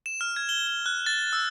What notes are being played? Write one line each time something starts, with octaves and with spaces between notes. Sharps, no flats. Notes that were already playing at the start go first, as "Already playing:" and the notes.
E7
F6
G#6
G7
G7
F#6
A6
E6